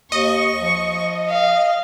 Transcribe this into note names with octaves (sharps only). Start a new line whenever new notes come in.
D#2 D#5 C#6
F3
F5